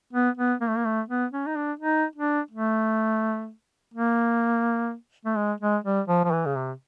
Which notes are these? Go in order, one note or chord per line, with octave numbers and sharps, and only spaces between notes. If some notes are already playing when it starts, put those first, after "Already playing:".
B3
B3
A#3
A3
A#3
A3
B3
C#4
D#4
D4
D#4
D4
A3
A#3
A3
G#3
G#3
G3
F3
F3
E3
C#3
C3